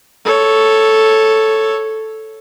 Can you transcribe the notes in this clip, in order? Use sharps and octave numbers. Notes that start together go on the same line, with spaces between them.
A4 C#5